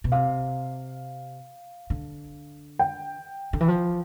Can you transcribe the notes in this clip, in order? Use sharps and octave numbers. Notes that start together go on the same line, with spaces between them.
B2
C3 F5
D3
G5
D3
E3
F3